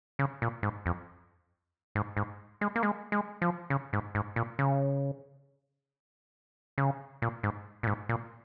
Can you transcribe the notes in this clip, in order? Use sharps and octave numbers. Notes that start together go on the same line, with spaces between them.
C#3
A#2
G#2
F2
G#2
G#2
G#3
A#3
G#3
G#3
F3
C#3
G#2
G#2
A#2
C#3
C#3
A#2
G#2
A#2
G#2
A#2